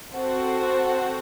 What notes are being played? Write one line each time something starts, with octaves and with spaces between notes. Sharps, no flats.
C4 F#4 A4 C5 F#5